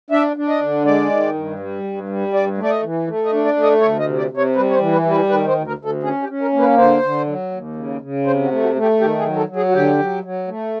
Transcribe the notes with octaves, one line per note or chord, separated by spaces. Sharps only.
D4 E5
D4
D#5
D3
G#3 D5
D#3
G2
G3
G2
G3
G2 D5
A3
D5
D#5
E3
A3
D#5
D4
D5
A3
D#5
D2 C#5
D#5
C3
D5
C3
C#5
G3 B4
C#5
C5
E3
B4
G3
B4
D#3 B4
C5
D2
A#4
D2
A4
C#4 G#4
G4
C#4
A#4
A#3
B4
D3 C5
D3
F#3
D#2
C#3
C#3
C3 C5
F#4
A3
F#4
A3
G4
D#3 G4
G#4
F#3
A4
F#3
G#4
F#4
D3 G4
F#3
F#3
A3